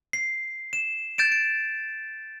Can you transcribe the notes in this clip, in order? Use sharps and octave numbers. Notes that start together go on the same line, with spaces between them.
C7
E7
G6 A6 D7 E7
D7